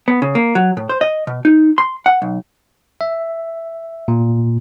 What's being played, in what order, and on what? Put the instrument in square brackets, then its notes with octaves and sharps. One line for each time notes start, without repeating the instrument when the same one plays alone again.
[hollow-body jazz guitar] B3
C#3
A#3
F#3
A2
C5
D#5
B2
D#4
C6
F#5
B1
[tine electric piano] E5
A#2